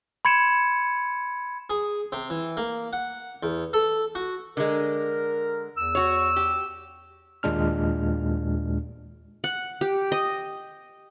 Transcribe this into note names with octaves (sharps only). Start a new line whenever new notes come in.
B5 C6 G#6 C#7 D7 E7
G#4
C3
E3
A#3
F#5
E2
A4
F#4
D3 G#3 A#4
E2 E6
F#4 C#5
G4
D#2 A#2 G#3 D4 F6
F#5
G4
D#5